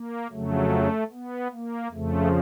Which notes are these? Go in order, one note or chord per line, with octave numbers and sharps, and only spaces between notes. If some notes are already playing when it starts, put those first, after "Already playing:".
Already playing: A#3
F2 C#3 F#3 A3
B3
A#3
F2 C#3 F3 A3